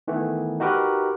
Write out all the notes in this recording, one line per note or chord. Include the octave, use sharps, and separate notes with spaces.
D#3 E3 A3 B3
D#4 F#4 G4 A#4 B4